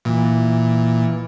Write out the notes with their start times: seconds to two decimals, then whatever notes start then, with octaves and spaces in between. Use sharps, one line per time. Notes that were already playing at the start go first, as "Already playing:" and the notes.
0.05 A#2 E3